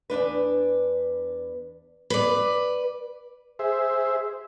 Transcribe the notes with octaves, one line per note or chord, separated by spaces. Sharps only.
E2 G#2 D4 B4
B4 D5
G#4 C5 E5